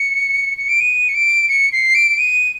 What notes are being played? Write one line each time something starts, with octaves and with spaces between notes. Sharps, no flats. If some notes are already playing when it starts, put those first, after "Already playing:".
Already playing: C#7
C#7
D7
D#7
C#7
D7
C#7
C7
D7
D#7